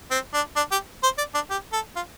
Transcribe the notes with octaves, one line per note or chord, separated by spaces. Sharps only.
C4
D4
D4
G4
C5
D5
D4
G4
A4
F4